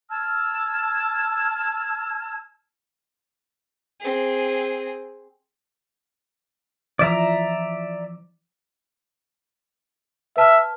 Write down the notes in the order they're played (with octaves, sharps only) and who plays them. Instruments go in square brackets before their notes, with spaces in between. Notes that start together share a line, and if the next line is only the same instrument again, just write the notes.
[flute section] A5 E6 F6 G#6
[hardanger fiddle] C4 G#4
[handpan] E3 F3 [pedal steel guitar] D5 E5 A#5
[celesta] B4 A5 F6 [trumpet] E5